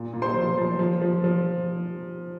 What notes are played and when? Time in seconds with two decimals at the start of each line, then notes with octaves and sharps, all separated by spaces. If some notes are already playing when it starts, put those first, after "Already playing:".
Already playing: A#2
0.14 A#2
0.22 C5 C6
0.37 F3
0.57 F3
0.79 F3
1.02 F3
1.24 F3